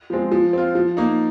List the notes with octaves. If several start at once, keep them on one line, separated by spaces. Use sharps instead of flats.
F3 G#3 C4
F3
C4 F4
F3
A#3 D#4